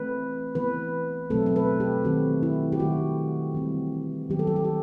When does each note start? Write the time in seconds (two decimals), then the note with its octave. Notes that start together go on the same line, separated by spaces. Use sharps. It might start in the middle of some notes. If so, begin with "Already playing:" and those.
Already playing: E3 A3 C4 B4
0.55 E3 B3 B4
1.30 B2 F#3 A3 C4 A4
1.46 A4
1.56 B4
1.80 G4
2.05 D#3 A3 C4 F#4
2.43 E4
2.72 G4
2.80 D#3 A3 C4 F#4
3.55 E3 G3 C4
4.30 D#3 F#3 B3 G4
4.39 A4
4.47 G4
4.56 A4
4.65 G4